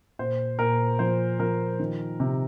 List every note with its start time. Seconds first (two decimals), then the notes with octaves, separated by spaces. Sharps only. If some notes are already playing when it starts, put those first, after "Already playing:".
0.19 A#2 C5
0.59 A#2 A#4
0.99 F3 C5
1.39 F3 A#4
1.80 D#3
2.20 C3